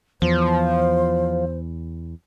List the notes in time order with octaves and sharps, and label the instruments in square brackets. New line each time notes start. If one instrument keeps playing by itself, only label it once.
[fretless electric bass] E2 [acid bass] F3 [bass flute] C5